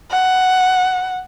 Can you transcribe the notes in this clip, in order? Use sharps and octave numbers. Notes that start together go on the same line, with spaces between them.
F#5